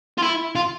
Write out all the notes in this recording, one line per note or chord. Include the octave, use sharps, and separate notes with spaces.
F4
E4
F4